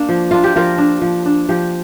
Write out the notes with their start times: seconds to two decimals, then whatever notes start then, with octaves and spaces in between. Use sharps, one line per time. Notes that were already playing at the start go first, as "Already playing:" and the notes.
Already playing: A#3 D4
0.09 F3
0.31 A#3 D4 F4
0.44 G4
0.56 F3 F4 A#4
0.78 D4
1.01 F3
1.26 D4
1.49 F3 G4